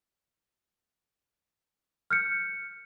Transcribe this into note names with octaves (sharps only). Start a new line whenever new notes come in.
F6 G6 C#7